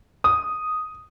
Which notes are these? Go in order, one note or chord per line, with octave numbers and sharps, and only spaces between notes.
D#6